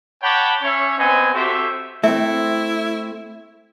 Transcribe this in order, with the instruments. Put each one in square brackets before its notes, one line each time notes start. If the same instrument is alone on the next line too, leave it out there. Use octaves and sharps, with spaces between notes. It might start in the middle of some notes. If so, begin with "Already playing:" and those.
[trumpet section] C#5 F#5 G5 A5 B5 D6
C#4 C#5 E5
B3 C4 D#5 G#5
C4 F#4 G4 A4 C5 E5
[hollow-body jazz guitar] A3 C4 [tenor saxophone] E4 [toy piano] E5